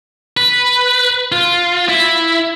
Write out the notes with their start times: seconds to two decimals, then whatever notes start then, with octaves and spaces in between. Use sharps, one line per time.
0.37 B4
1.32 F4
1.89 E4